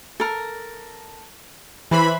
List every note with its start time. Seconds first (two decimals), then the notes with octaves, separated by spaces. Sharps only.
0.20 A4 A#4
1.91 E3 B4 C5 E5 B5